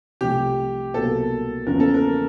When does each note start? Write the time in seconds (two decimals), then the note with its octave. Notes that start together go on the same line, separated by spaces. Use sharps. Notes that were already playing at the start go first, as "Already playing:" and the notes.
0.21 C2 C3 F3 A3 G4
0.94 C2 B2 F#3 A#3 A4
1.66 E2 C#3 F3 A#3 C#4 A#4
1.80 A4
1.94 A#4